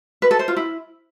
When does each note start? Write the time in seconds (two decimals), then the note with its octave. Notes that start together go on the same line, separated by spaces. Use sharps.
0.22 B4
0.31 A4
0.39 C5
0.48 F4
0.56 E4